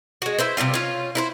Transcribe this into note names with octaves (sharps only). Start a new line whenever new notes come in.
G#3 F#4
E4 B4 C5
C3 D#3 G3 F4
C#4 F4
E4 A4 C5